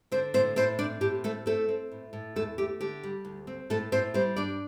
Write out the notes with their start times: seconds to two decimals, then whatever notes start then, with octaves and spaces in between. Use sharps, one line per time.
0.12 D3 C4 C5
0.34 A2 C4 C5
0.56 A2 C4 C5
0.79 C4 D4 D5
1.01 A2 G4
1.24 A3 C4 A4
1.46 A3 C4 A4
1.69 C4
1.91 A2
2.13 A2
2.36 E2 A3 A4
2.58 A3 G4
2.81 D3 G4
3.03 G3
3.25 D2
3.47 C4
3.70 A2 A3 A4
3.92 A2 C4 C5
4.14 G3 C4 C5
4.36 G2 D4 D5